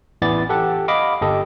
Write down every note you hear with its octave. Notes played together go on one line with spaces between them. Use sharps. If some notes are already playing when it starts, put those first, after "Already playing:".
A1 E3 B3 D5 A6
G4 A4 F#5
D#5 F5 B5 D6
G1 G4 A4 D#5